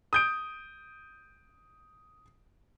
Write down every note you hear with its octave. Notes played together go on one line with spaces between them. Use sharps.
D#6 G6 D7